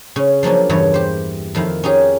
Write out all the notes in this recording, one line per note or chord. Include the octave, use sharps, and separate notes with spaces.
C#3 C#4
F3 F#3 A#3 C#4 D4
E2 G2 C#3 E3 C#5
G4 C5
F2 D#3 E4 F5
C#4 D#4 G4 G#4